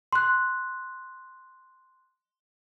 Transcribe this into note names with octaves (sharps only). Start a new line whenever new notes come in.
C6 F#6